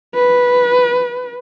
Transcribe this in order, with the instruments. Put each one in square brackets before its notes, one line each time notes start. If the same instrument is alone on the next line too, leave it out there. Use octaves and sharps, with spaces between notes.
[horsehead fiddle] B4